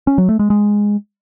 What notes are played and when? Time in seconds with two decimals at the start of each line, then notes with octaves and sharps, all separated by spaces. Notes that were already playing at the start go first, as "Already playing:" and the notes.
0.07 C#4
0.18 F#3
0.29 A3
0.39 G#3
0.50 G#3